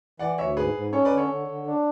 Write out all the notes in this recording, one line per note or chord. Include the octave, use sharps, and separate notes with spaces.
E3 D5 F#5
D2 C#5 E5
G#2 G#4 B4
G#2
C#4 A4 C#5
B4 D5
D3
A4 C#5
D3
D3
D4